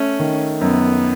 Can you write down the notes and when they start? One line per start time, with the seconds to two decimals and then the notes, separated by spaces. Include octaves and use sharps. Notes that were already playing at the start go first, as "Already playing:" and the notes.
Already playing: A3 C#4
0.19 D#3
0.61 F#2 B3